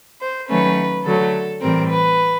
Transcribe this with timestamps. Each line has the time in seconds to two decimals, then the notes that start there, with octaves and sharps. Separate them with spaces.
0.21 C5
0.49 D#3 F#3 A3 C#4 B4
1.05 D3 F#3 A3 A4
1.61 A2 E3 G3 C4 A#4
1.90 B4